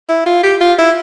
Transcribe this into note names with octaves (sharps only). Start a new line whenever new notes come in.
E4
F4
G4
F4
E4